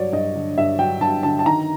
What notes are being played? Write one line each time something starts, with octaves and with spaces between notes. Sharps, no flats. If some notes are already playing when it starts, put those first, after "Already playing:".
Already playing: G2 F#3 C#5 D5
G2 D#5
D3
G2 E5
F#3 G5
G2 A5
D3 A5
A5
D#3 A#5